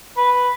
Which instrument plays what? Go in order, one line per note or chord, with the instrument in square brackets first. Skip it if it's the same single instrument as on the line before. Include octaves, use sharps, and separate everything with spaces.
[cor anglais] B4